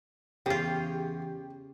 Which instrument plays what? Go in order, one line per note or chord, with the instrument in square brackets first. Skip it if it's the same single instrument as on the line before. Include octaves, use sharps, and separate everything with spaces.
[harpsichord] E2 [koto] C#3 F4 [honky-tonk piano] G4